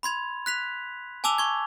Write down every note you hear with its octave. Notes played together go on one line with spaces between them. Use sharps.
B5 C6 G#6 F7
F#6 B6 F7
G#5 A5 D6 E6 F7 G7
C#6 G#6